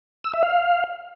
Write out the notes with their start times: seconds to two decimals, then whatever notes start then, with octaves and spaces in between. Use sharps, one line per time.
0.24 E6
0.34 E5
0.43 F5